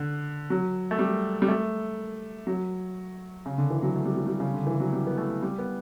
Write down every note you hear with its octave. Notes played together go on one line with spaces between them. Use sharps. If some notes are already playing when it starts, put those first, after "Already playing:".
Already playing: D3
F#3
A3
G3
G3
A3
F#3
C#3
D3
E3
F#3
A3
G3
F#3
G3
C#3
D3
E3
F#3
G3
B3
A3
G3
B3